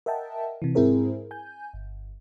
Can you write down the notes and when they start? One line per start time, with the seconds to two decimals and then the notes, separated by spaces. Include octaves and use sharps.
0.06 A#4 D#5 E5 F#5 G5 A5
0.62 C3 E3
0.75 G#2 C4 E4 G#4 A#4 C5
1.31 G#5 G6
1.74 G1